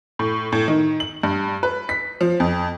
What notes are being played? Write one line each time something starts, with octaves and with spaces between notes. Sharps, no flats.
A2
A2
D#3
F#7
G2
B4
B6
F3
F2